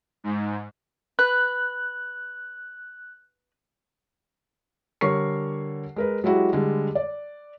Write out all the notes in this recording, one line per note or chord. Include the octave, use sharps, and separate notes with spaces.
G#2
B4 F#6
D3 G3 A#4 C#5 C#6 C7
G#3 A#4 B4
F#3 G#3 E4 F#4 G4
D3 G3 G#3
D5